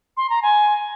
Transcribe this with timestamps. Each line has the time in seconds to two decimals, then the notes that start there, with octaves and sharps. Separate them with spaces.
0.17 C6
0.30 A#5
0.42 G#5